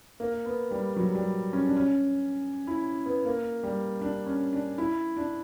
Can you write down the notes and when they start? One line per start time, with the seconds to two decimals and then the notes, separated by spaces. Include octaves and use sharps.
0.20 A#3
0.45 B3
0.71 G3
0.96 F#3
1.15 G3
1.53 C#4
1.66 D4
1.77 C#4
2.67 E4
3.06 B3
3.25 A#3
3.63 G3
4.01 D4
4.26 C#4
4.53 D4
4.78 E4
5.17 D4